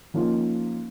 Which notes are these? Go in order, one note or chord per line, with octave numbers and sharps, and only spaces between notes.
F3 A#3 C#4 D#4 F4